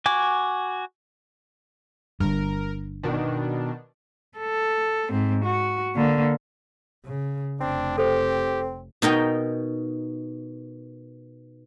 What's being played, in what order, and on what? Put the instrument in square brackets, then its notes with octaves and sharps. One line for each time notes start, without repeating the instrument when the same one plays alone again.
[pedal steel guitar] F#4 G#5 D6
[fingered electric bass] G1 G2 [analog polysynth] A#4
[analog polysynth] B2 D#3 D4
[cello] A4
G#2 C4
F#4
D3 A#3
[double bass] C#3
[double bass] F1 [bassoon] C4 [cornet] D4
[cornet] G4 [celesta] A4 C5
[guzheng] B2 D#4 A#4 G5